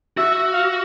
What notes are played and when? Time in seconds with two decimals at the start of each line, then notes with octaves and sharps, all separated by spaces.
0.17 F#4 E5
0.35 E5
0.53 F5